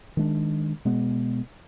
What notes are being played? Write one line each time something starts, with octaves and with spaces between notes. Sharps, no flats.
D#3 G#3 B3 D4
B2 G#3 B3